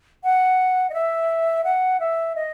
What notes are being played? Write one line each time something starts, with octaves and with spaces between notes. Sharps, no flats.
F#5
D#5
E5
F#5
E5
D#5